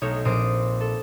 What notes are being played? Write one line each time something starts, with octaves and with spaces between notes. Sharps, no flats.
B1 A3 D#4 C#5 G6
A#1 A#2 C4 C6 D#6 D7
A4